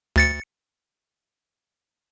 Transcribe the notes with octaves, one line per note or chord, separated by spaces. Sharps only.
D2 A6 C#7